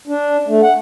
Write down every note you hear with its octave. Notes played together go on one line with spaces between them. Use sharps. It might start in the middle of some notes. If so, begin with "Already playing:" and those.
D4
A3
F#5